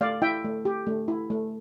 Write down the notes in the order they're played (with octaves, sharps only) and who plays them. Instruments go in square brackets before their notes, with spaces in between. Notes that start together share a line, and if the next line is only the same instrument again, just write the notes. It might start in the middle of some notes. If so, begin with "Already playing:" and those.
[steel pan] A3 D5 F5
E4 E5 G5
A3
G4
A3
E4
A3